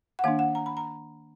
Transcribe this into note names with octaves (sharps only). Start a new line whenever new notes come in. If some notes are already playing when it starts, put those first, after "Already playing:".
F#5
D#3 A#3 D4 F5
F#5
A#5
B5
A#5